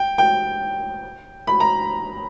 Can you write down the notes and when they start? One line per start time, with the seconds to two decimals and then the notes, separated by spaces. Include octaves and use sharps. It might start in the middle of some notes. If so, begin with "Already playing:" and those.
Already playing: G5
0.18 G5
1.47 B5
1.60 A#5